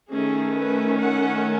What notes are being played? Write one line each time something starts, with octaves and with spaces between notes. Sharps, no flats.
D#3 A3 C#4 G#4
B4
F#5